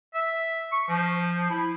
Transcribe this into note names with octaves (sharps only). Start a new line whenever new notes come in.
E5
C#6
F3
E4